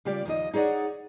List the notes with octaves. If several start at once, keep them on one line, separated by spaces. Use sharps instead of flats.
C#3 G3 F4 G4 D5
D#2 F3 D#5
D#4 G#4 C#5 D5 F#5